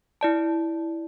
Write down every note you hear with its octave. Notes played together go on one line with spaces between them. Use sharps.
E4 D5 A5